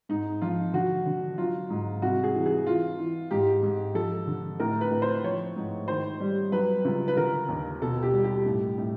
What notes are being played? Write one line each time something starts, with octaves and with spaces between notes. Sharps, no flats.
G#2 D#4
F3 F4
D3 F#4
D3
F#3 F4
G#2
C2 F#4
G#4
E3
G#4
E3 F4
E3
G#2 G4
G#2
F3 A4
D3
A2 A#4
B4
A2
C5
F3 C#5
G#2
D#3 C5
G3
F#3 B4
C#2
B4
D3 A#4
D#2
B2 A4
G4
G3
G4
A2
A2